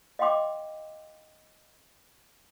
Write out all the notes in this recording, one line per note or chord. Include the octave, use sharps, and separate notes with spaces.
D#5 F5 G5 C6 D6